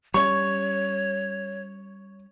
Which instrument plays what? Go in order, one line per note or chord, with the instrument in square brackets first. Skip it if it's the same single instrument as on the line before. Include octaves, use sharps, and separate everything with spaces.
[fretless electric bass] G3 C#4 [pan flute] C#5 [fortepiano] C#6